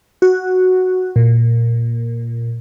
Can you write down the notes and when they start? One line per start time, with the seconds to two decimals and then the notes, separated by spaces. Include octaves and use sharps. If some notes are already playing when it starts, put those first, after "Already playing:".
0.22 F#4
1.16 A#2